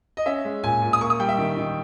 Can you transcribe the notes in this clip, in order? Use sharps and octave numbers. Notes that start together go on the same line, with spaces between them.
D#5
C#4 E5
G#3
A#2 G#5
A#2
D#6
A#3 C#6
D#6
G3 G5
E5
D#3
D#3